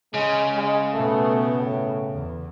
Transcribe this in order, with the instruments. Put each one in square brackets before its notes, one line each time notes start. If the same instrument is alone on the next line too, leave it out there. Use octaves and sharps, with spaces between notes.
[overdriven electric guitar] C#3 [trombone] G#3
[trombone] G#3
[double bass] B2 B3 [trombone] A3
[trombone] A2
[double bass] E2